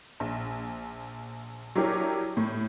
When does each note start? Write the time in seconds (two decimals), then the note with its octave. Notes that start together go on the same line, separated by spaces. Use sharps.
0.20 A#1
1.75 F#3 D4 E4 G4 A#4 C#5
2.37 A2